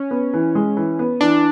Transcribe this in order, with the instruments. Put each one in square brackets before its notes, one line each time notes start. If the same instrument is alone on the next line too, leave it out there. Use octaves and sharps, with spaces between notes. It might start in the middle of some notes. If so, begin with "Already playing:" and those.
Already playing: [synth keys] C#4
[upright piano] B3
E3
G#3
E3
B3
[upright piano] E3 [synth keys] D4